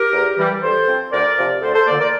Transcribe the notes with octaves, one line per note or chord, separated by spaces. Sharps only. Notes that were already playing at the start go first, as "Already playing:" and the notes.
Already playing: G4 A#4
E2
E3 G3
G2 A4 C5
F3 C4
D2 A#4 D5
C3 F3
D2 A4 C5
A4 C5
D3 F3 A#3 A#4 D5
A#4 D5